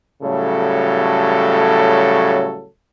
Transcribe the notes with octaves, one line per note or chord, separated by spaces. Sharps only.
A2 C#3 F#3 G3 A4